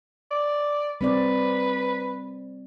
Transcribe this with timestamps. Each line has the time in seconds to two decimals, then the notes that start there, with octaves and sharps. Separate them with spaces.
0.31 D5
1.01 G3 C4 B4 D5